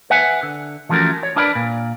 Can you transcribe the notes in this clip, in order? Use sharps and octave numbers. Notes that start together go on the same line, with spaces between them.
B4 E5 F#5 G#5
D3
E3 F3 A3 C#4 F#4 A#4
C#5
D4 E4 A#4 B4 D5 B5
A#2